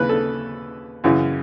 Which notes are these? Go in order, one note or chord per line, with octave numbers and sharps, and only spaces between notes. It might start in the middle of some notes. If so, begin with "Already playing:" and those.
Already playing: D#2 C#3 E3 B4
A4
F#2 C#3 E3